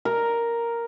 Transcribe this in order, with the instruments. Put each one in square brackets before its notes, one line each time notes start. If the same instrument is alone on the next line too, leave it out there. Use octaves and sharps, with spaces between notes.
[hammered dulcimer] A#4